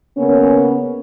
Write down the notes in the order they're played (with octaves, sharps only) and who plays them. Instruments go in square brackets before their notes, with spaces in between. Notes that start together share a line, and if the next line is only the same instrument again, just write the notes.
[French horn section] C#3 A#3 B3 C#4